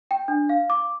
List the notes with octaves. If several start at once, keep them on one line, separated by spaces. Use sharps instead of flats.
G5
D4
F5
D6